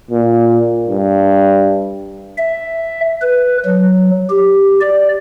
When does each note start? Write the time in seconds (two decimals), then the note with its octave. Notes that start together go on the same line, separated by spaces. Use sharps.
0.11 A#2
0.88 G2
2.38 E5
3.22 B4
3.65 F#3
4.30 G4
4.81 D5